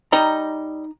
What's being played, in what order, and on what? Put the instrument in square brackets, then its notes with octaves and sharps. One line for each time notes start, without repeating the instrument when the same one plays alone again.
[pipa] G3 D#5 [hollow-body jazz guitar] D#4 A#5